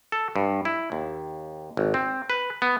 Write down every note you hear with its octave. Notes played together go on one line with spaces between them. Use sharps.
A4
G2
E4
D#2
G#1
C4
B4
B3